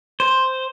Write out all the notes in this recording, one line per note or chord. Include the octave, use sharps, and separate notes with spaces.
C5